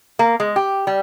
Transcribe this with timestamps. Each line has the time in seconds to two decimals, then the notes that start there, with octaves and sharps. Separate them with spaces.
0.19 A#3
0.40 G#3
0.56 G4
0.87 G3